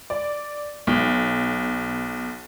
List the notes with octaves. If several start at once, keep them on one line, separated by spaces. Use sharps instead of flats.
D5
B1